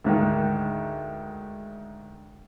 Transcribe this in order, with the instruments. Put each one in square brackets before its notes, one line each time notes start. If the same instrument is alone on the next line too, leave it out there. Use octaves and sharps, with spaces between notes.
[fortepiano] D2 G#2 D#3